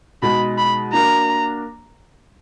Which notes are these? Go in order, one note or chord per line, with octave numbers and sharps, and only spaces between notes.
B2 G#3 D#4 B5
B5
A#3 D4 F#4 A#4 A#5